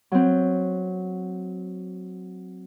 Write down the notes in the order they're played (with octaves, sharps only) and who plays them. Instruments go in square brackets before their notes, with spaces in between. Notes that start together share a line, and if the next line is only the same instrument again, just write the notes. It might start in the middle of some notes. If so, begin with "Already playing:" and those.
[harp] F#3 C4